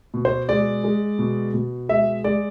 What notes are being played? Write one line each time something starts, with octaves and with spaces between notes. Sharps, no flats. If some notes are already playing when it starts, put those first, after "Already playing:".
B2
C5
G#3 D5
G#3
B2
B2
G#3 E5
G#3 D5